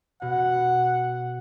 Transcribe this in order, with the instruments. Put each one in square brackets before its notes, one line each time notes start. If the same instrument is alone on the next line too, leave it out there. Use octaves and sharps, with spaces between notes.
[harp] B2 [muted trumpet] F#5